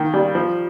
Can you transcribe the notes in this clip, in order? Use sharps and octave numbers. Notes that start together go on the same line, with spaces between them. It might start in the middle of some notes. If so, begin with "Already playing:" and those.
Already playing: D#3 A#3
G3
F3